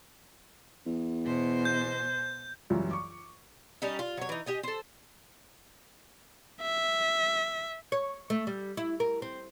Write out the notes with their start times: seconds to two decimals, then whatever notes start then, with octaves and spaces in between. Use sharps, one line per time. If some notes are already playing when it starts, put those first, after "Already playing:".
0.86 E2
1.26 B2 C5
1.65 G6
2.70 C#2 F#2 E3 G3
2.91 C#6 D6
3.82 G3 C#4 D#4
3.99 F4
4.17 F#3 C#5
4.29 E3 D#4
4.46 G4 D#5 G#5
4.63 A4 C5
6.62 E5
7.92 C#5
8.30 A3
8.47 G3
8.77 E4
9.00 A#4
9.22 C4